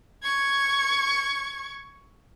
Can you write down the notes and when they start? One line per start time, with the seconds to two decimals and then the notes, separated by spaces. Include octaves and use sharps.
0.22 C#6 G#6